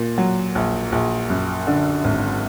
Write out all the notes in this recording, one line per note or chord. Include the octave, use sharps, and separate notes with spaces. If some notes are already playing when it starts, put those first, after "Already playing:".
Already playing: A#2
F#3
A#1
A#1
F#2
D3
G#1